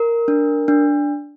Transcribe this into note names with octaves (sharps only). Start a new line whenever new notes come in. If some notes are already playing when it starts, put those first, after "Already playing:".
Already playing: A#4
D4
D4